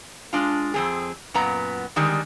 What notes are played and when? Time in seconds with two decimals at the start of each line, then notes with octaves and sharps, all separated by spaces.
0.33 G#3 D4 F4
0.74 F2 C4 G#4
1.34 F#2 A#2 B3 A#5
1.96 D3 D#3 G3 G#3